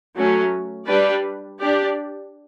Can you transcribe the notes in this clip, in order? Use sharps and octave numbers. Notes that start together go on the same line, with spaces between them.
F#3 A3 C#4
G3 D4 G4 B4 D5
D4 G4 D5